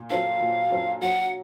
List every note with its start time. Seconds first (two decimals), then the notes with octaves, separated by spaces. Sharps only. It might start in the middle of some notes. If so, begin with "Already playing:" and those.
Already playing: A#2
0.10 F#3 C4 F4 A4 F5
0.40 A#2
0.70 F#3 C4 F4 A4
1.01 F#3 F#5